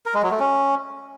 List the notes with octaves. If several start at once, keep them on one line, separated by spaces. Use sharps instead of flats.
A#4
G#3
F#3
A3
C#4